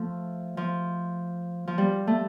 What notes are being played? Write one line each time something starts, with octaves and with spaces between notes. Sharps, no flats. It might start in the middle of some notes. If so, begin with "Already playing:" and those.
Already playing: F3 A3
F3
F3
G3
A3